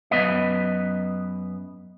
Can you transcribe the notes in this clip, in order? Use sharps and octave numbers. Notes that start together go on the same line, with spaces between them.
F#2 D#3 B3 B4 D#5